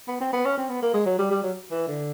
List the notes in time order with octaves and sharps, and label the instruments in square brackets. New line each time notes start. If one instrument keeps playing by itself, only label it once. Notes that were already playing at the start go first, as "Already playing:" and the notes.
[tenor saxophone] B3
C4
B3
C#4
C4
B3
A#3
G#3
F#3
G3
G3
F#3
E3
D3